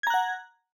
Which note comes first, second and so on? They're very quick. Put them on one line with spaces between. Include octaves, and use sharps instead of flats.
G#6 A#5 F#6 F#5